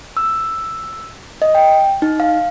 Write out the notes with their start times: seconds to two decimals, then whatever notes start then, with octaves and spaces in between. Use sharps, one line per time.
0.17 E6
1.42 D#5
1.55 G5
2.02 D#4
2.20 F5